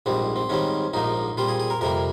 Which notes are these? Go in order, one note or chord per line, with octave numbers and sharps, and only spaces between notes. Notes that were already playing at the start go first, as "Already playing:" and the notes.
A#1 G#2 G3 C4
C4
G#2 D#3 G3 C4 C#4
A#1 G#2 F3 A#3 D#4
A#2 G3 C4 F4
G#4
G#4
A#4
F2 C3 G3 A#3 A#4